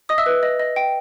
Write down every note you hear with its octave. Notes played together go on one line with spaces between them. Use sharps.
D#5 D#6
E5 E6
B4
D#5
D#5
G5